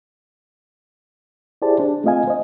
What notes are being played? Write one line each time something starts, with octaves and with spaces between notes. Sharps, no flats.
E4 G4 G#4 C5 D5 A5
D4
A3 C4 F4 D#5 F5 G#5
C5 D#5